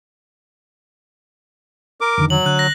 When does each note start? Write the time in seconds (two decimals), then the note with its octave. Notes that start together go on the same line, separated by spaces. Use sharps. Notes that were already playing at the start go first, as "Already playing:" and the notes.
2.01 A#4 D6
2.18 F2 D3 D#3
2.30 F#3 F#7
2.46 D3 F#6
2.59 A#6